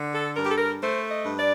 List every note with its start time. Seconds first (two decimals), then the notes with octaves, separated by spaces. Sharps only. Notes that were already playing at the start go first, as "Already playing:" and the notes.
Already playing: D3
0.14 A4
0.36 G2 A#4
0.44 G4
0.51 A4
0.58 A#4
0.80 A3 C5
1.09 D#5
1.24 G2
1.38 D5